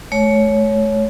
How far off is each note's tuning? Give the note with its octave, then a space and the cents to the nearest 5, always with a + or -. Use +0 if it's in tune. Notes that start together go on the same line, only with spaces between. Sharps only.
A3 -45 C#5 +5